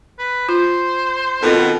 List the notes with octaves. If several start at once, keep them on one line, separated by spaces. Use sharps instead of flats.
B4
F4 C5
B2 D#3 B3 C4 F4 A4